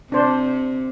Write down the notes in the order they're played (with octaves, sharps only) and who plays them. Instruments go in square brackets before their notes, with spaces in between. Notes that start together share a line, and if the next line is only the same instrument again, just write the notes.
[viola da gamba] C3 [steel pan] D4 C5